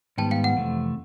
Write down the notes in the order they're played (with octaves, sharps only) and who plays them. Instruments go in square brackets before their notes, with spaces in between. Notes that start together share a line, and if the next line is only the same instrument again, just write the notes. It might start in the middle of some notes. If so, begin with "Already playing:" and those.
[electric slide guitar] G#2 D#3 G3 B3 [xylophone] G5 A5
[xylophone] F5 G5
F#5
[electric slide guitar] F2 C3 E3 A3